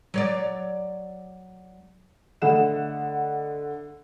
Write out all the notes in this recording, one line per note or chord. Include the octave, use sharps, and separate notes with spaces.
F#3 C#5 D5
D3 A3 D#5 F#5 B5 E7